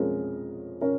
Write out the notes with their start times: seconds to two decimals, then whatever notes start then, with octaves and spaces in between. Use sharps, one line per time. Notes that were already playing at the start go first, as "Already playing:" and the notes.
Already playing: F2 F3 G#3 C#4 A#4
0.81 C#4 A#4